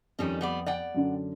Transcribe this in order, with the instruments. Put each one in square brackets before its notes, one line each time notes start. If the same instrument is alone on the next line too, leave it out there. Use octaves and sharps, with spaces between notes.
[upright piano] F2 [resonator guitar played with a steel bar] D#3 G3 C#4
[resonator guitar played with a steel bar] G3 B3 D5
D5 F#5 G5
[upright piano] F#2 D3 D4